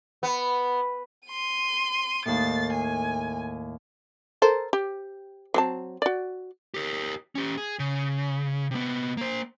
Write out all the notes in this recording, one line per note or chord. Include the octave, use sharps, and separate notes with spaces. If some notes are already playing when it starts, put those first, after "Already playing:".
B3
C6 D#7
D#2 A2 A6 C7
G#5
A4 A#4 C5
G4
F#3 C4 A5
F#4 D5
G4 A#4
C#4 G4
G#4
C#3
C3 B3
A#3 C5